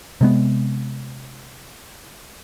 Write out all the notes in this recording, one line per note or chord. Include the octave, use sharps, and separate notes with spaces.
C3 G#3 B3